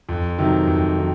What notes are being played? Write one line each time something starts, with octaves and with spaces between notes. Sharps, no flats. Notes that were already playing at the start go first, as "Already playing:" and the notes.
F2
C3 D#3 F#3
F2
D#3 F#3